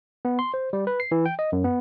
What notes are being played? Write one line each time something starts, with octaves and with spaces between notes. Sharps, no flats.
B3
C6
C5
G3
B4
C7
E3
G5
D#5
F#2
B3